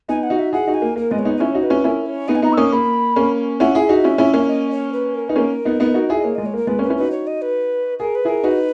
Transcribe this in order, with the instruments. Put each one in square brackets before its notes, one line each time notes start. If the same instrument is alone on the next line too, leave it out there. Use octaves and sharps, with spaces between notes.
[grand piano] B3 D#4 [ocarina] G#5
[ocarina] F#5
[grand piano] D#4 F#4
[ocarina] E5
[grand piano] E4 G#4 [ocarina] F#5
[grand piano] D#4 F#4
[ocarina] G#5
[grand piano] A#3
[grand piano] A#3 [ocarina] A#4
[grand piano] G#3 B3 [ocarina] D#5
[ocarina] C#5
[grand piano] B3 D#4
[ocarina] D#5
[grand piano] C#4 E4 [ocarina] C#5
[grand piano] D#4 F#4
[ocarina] B4
[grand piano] C#4 E4
[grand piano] C#4 E4 [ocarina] A#4
[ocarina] C#5
[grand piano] B3 D#4 [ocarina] D#5
[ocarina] G#5
[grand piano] B3 D#4 [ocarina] A#5
[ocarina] E6
[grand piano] A#3 C#4 [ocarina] D#6
[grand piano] A#3 [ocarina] B5
[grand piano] A#3 C#4
[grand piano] C#4 E4 [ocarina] F#5
[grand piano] E4 G#4
[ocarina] E5
[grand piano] D#4 F#4
C#4 E4
C#4 E4
A#3 C#4
[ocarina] D#5
C#5
B4
A#4
[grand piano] D#4 [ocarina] B4
[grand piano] A#3 C#4 [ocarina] A#4
[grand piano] B3 D#4
B3 D#4
D#4 F#4
[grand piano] E4 G#4 [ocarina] E5
[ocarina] D#5
[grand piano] A#3 [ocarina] C#5
[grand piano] G#3 [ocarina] D#5
[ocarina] C#5
[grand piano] A#3 [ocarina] A#4
[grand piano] G#3 B3 [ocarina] B4
[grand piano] A#3 C#4
[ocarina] B4
[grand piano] C#4 E4
[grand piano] D#4 F#4 [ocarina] B4
[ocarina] C#5
D#5
B4
[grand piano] G#4 [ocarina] A#4
[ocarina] B4
[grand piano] E4 G#4 [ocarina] A#4
[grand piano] D#4 F#4 [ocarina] B4